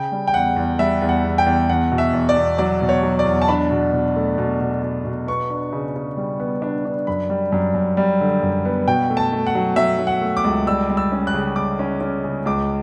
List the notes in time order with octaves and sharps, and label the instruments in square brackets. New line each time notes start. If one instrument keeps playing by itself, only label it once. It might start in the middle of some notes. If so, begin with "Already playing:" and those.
Already playing: [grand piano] C#3 G5
G3
G5
E2 F#5
E2
G3 E5
E2
F#5
E2
G5
E2
E2 F#5
B2
E5
E2
D5
E2
F#3 D5
B2
C#5
F#3
D5
E2
A5
D4 B5
B2
B2
A3
B2
B2
B2
B2
B3 C#6
D4
C#3
C#3
G3
B3
D4
D4
F#2 B5
G3
F#2
F#2
G3
D3
F#2
B3
B2 G5
A3
A5
A3
F#5
F#3
F#3 E5
F#3
F#5
A3
D6
C#2
G3 E6
G3
E6
C#4
F#6
C#3
G3 D6
C#4
C#4
C#3
C#2 D6